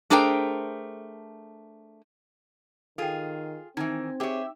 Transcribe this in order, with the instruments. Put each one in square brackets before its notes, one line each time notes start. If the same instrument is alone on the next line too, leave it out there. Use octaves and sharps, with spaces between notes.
[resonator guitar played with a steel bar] A3 D4 G#4 A#4 C5 G5
[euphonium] D#3 [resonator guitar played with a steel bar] F4 G#4 [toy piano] A4 G5
[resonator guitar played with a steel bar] D#3 E3 [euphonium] C4 [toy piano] D#4 [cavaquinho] G#5
[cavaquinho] G4 E5 [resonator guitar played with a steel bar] G#4 C#5